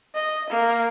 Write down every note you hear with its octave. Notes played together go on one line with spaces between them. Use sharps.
D#5
A#3